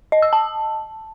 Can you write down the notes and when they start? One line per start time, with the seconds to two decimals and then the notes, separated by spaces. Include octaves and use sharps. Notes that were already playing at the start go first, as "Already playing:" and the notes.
0.12 D#5
0.22 E6
0.33 A5